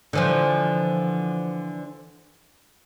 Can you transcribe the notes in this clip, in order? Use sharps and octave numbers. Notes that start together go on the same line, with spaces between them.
D3 E3 F3